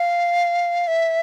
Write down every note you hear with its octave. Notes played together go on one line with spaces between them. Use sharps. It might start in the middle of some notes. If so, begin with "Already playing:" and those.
Already playing: F5
E5